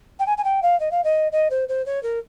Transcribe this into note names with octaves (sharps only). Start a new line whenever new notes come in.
G5
G#5
G#5
G5
F5
D#5
F5
D#5
D#5
C5
C5
C#5
A#4